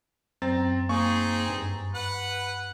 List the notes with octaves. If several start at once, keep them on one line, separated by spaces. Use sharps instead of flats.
F#2 C4 A#5 A6
A#3 C4 D#4 G#4 C#6
G2
B4 F#5